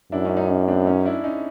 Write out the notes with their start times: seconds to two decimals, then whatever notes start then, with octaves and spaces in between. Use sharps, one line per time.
0.12 F#2 D4 E4
0.25 C#4 D#4
0.37 C#4 D#4
0.49 C#4 D#4
0.68 C4 D4
0.86 C#4 D#4
1.05 D4 E4
1.24 C#4 D#4